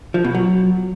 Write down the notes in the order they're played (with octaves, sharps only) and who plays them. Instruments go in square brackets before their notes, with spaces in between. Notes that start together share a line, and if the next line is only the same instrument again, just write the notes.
[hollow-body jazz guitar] F3
B2
F#3